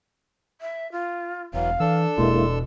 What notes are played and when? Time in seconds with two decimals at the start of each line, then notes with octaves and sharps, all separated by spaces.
0.61 E5
0.92 F4
1.54 E1 E3 F#3 F5
1.80 E3 D4 A4 E6
2.18 E1 B2 G#3 A#3 E4 C6